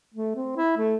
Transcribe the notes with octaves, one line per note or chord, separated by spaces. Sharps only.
A3
C4
E4
A3